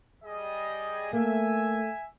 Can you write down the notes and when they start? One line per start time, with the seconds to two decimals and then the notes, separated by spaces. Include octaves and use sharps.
0.24 G3 G#4 D#5
1.13 A3 A#3 E5 G#5